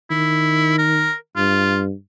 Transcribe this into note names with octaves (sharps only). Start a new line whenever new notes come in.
D#3 E4
A#4
G2 F4